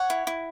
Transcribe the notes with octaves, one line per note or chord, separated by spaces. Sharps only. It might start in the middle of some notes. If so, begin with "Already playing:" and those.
Already playing: C#5 F#5
E4
E4